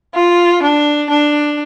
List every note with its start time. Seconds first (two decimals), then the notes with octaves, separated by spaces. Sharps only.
0.15 F4
0.63 D4
1.10 D4